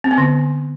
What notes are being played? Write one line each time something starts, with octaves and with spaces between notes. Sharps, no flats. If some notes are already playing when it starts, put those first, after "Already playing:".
C4
B3
D3